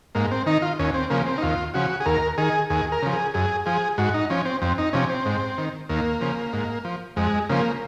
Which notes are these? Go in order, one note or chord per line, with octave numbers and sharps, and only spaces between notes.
G#2 A#3
C4
D#3 D#4
F4
D#2 C#4
C4
C#3 F3 A#3
C4
D#4
D#2 F4
C#3 F3 F#4
G#4
D#2 A#4
D#3 G#4
D#2 G#4
A#4
C#3 F3
G#4
F#2 G#4
F3 G#4
G#2 F#4
D#4
F3 C#4
C4
F2 C4
D#4
C3 F3 C#4
C4
G#2
D#3
D#2 A#3
C#3 F3
G#2
F3
F2 G#3
C#3 F3 A#3